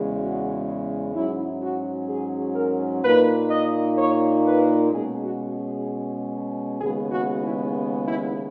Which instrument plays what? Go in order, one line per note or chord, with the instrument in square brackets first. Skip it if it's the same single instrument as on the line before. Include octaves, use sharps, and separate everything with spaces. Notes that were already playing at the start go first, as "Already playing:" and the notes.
Already playing: [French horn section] E2 C#3 G#3
F#4
G#2 F#3 C#4 E4
F#4
G#4
A#4
A#2 A#3 D#4 B4
D#5
C#5
B4
B2 G#3 C#4 G#4
F#4
G#4
D#2 C#3 G#3 B3 G#4
F#4
E4
E4